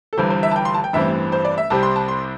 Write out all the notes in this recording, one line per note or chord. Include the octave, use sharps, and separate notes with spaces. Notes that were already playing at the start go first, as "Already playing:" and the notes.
A4
G1 G2 E3 C5
C5
E5
A5
G5
C6
A5
G5
A1 G2 E3 C4 E5
C5
D5
E5
C2 C3 G3 C4 A5
C6
A5
C6